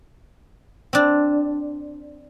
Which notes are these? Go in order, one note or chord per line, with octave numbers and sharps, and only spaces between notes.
C4 D4